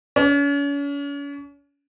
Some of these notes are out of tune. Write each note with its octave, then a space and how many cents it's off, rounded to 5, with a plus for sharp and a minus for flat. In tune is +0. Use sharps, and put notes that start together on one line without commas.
C#4 +40